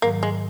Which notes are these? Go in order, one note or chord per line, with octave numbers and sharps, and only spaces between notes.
G#2 D#3 F#3 A#3
G#3